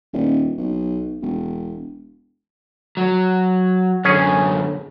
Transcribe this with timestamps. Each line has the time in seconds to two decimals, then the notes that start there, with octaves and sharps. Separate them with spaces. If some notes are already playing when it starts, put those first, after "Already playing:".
0.13 D#1
0.58 B1
1.22 E1
2.97 F#3
4.05 F#2 D3 C#4 G#4